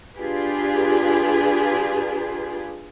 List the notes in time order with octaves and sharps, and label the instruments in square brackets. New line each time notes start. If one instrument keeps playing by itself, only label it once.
[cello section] D4 F4 G4 G#4 B4